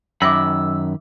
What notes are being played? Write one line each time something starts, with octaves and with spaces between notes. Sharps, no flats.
F#2 D#3 E5 G#5 B5 D6 E6